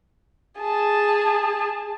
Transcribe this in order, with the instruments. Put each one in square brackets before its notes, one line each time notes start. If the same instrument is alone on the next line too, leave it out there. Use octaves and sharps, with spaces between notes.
[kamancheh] G#4 A5